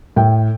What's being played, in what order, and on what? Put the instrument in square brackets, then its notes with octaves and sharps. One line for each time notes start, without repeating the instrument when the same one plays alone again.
[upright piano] A2 G5